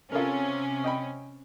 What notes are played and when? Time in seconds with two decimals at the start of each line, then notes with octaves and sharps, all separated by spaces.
0.12 C3 C#4 F4 A4 A#4
0.84 D#5 G5 B5